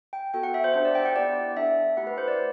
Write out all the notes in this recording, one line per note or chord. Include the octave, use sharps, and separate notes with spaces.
G5
B3 F#4 A4 G5
F#5
E5
C5
D4 G4 C5
D5
G5
F#5
B3 E4 G4 D5
D4 A4 E5
A3 E4 G4 F#5
B4
C5
D5